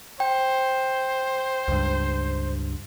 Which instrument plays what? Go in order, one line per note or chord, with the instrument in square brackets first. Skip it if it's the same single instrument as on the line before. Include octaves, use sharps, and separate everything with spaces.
[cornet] C5 [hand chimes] G5
[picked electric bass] C#2 G2